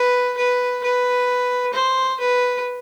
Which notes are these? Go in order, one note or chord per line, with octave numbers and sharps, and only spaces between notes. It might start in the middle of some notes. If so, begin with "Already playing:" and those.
Already playing: B4
B4
B4
C5
B4